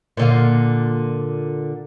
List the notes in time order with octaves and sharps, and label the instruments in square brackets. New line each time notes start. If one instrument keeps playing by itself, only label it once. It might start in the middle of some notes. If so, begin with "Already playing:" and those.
[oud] A#2 D3 F4